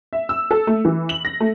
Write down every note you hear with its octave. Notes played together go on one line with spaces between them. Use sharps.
E5
E6
A4
A3
E3
F#7
A#6
A3